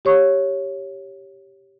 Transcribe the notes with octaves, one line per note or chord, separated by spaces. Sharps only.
G4 C#5 C#6